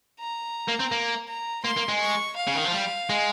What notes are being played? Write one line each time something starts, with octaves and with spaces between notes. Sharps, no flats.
A#5
A#3
C4
A#3
A#5
A#3 C6
A#3
G#3
C#6
F5
C#3
D#3
F3
G3
G#3